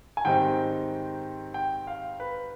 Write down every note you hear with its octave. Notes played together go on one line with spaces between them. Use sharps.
G#5
G#2 D#3 G3 C4 D#4 G5
G5
F5
B4